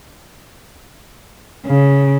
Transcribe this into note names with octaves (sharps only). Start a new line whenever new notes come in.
C#3